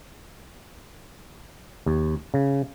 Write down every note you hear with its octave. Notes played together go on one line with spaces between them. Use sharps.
D#2
C#3